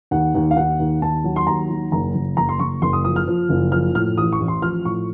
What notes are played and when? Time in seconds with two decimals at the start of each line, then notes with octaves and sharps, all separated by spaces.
0.11 D#2 F#5
0.35 D#2
0.51 F5
0.56 D#2 F#5
0.80 D#2
1.01 D#2 A5
1.24 F#3
1.36 C6
1.47 D#2 A#5
1.70 F#3
1.92 F#1 A#5
2.15 F#1
2.37 F#1 A#5
2.49 C6
2.60 F#1 C#6
2.82 F#1 C6
2.93 D#6
3.05 F3 D#6
3.16 F6
3.28 F3
3.49 F#1
3.72 F3 F6
3.95 A2 F6
4.17 A1 D#6
4.32 C#6
4.40 A1
4.48 C6
4.62 F3 F6
4.85 A2 C#6